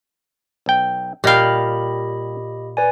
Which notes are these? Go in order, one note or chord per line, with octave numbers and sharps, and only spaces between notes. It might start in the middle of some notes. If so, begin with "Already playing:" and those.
B1 G5
A#2 G3 G4 D#5 F5 G5 B5
B4 D5 G#5